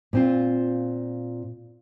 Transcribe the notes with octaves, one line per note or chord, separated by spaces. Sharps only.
A#2 C4 F4